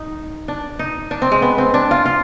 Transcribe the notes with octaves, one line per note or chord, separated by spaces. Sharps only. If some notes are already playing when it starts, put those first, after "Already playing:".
Already playing: D#4
D4
D#4
D4
C4
G#3
B3
C4
D4
F4
F4